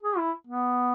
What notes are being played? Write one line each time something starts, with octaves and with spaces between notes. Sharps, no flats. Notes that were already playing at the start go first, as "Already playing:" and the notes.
G#4
E4
B3